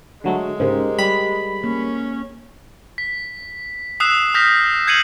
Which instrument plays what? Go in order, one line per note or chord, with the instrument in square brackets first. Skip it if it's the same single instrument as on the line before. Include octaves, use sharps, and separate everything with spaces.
[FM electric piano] D3 F#3 A3 [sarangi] G#3
[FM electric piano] G#2 C#3 [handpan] G4 A#4 C5
[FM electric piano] G3 [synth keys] B5
[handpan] A#3 [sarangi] C#4
[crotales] B6
D#6 E6 F#6 C7 E7
D#6 F6 G6 A#6 B6
G6 G#6 C7 C#7 D#7 F#7